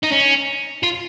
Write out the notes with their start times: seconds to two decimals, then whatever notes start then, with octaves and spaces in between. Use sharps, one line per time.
0.04 D#4
0.13 C#4
0.83 F4